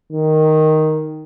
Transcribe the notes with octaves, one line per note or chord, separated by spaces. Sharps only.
D#3